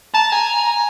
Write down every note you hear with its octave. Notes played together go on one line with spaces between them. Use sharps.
A5 A#5
G#5